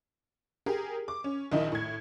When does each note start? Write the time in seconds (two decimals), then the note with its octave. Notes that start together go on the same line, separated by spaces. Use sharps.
0.66 G4 G#4 A#4
1.08 D6
1.24 C#4
1.52 A#1 D#3 D#4 E4
1.72 A2 G#6